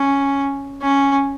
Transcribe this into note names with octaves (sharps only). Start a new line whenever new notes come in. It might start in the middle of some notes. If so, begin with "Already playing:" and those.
Already playing: C#4
C#4